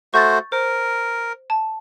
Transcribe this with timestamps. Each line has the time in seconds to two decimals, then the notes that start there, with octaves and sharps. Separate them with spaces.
0.14 A3 F#4 C5 C#6 G6 A6
0.52 A#4 C5
1.50 A5